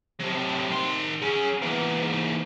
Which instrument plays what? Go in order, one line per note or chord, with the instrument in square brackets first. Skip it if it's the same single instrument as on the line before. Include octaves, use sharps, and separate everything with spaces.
[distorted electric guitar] A2 F#3 [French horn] C3
[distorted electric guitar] D#3 C6
[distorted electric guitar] F#3 C#4 [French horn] G#4
[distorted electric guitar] E3 A#3 [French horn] B3
[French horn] G#2